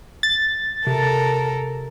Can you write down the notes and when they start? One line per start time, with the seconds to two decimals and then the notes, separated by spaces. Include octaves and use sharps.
0.23 A6
0.87 C3 A4 A#4